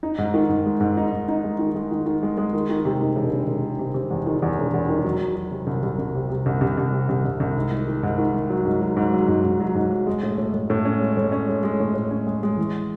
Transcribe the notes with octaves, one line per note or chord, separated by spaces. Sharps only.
D#4
G#2
D#3
G#2
G#3
G#2
D#4
G#2
D#4
G#3
D#3
G#3
D#3
D#3
G#3
G#3
D#3
D#3
C3
D#3
E1
E1
E1
D#3
C3
C3
E2
D#3
E2
E1
E2
D#3
F#3
F#3
F#3
C3
C2
C2
C2
C3
C3
C2
C2
C2
C3
C2
C2
C2
G#2
D#3
D#3
G#2
D#3
G#2
F#3
G#2
F#3
G#2
F#3
G#2
G#2
F#3
G#2
F#3
G#3
A2
A2
A2
A2
C#4
G#3
A2
C#4
G#3
G#3
A2
A2
C#4
G#3
G#3
E3